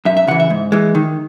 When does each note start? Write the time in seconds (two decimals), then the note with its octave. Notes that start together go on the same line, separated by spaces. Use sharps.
0.05 F#2 E5
0.17 E5
0.27 C#3 E3 F#5
0.40 E5
0.50 G#2
0.72 E3 G#3
0.95 D#3